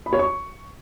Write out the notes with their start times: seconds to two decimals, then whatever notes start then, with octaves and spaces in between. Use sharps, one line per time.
0.06 B5
0.13 C#5
0.19 C#6